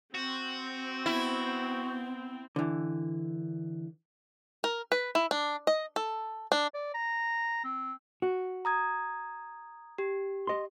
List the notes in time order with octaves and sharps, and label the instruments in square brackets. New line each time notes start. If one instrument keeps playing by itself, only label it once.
[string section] C4 [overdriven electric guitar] F#4
[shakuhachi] B3 [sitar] E4
[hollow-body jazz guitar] D3 E3
[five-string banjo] A#4
B4
E4
D4
D#5
A4
D4
[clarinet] D5
A#5
C4
[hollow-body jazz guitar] F#4
[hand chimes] A#5 D#6 G#6
G4
[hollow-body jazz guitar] D#5 C6